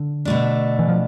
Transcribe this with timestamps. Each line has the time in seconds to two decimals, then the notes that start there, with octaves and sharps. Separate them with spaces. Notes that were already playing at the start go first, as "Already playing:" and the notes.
Already playing: D3
0.25 B2 A3 D4
0.79 E3
0.89 F3